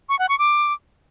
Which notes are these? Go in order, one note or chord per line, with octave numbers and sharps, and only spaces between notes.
C#6
F#5
C#6
D6